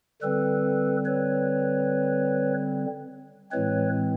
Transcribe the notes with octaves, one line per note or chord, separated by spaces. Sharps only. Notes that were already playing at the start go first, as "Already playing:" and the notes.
D3 G3 C4 A4 B4
B4 C#5
A2 E3 G#3 C4 B4 C#5